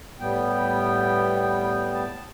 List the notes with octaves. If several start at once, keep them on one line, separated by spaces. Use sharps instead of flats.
A2 G3 B3 G5
A5